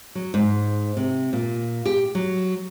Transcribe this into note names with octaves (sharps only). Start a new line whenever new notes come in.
F#3
G#2
C3
A#2
G4
F#3